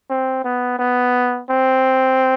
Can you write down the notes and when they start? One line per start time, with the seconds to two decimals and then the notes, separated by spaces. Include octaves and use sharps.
0.10 C4
0.44 B3
0.79 B3
1.50 C4